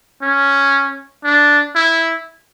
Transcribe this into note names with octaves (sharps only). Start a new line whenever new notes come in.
C#4
D4
E4